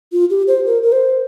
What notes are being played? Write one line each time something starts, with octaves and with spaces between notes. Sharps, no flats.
F4
G4
C5
A#4
A#4
C5